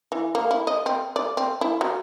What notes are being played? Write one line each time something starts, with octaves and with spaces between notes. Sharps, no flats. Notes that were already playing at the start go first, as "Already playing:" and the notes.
E3
A#3
E4
D#5
C4
D5
C4
E4
F#3